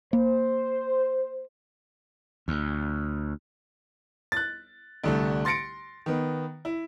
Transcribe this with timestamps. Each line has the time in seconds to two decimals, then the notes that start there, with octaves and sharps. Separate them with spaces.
0.13 A#3 C5
2.48 D2
4.32 F#6 A6
5.04 C2 D3 A3
5.45 C6 A6 A#6 C#7 D7
6.06 D#3 B3
6.65 E4